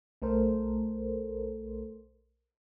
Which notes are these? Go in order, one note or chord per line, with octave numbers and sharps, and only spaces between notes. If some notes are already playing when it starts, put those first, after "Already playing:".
B1 A3 A4 A#4 C5